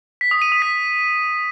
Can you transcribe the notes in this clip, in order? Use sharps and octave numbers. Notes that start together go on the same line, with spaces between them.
B6
D#6
D#7
D#6
B6